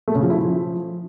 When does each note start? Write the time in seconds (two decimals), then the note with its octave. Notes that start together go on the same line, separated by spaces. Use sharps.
0.08 A3
0.15 C#3
0.23 F3
0.30 E4
0.38 F3